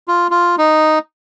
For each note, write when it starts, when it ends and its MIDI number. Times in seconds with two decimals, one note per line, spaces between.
0.08 0.27 65
0.31 0.55 65
0.58 0.99 63